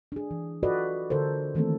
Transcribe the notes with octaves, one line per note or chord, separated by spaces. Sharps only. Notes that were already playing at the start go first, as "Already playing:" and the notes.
D4 G#4
E3
F4 F#4 A4 B4 D5 D#5
D3 A4 A#4 C5
D#3 E3 A3 A#3 C4 A4